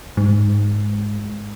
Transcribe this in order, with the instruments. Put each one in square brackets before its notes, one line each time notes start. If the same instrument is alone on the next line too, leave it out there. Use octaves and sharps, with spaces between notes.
[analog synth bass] G#2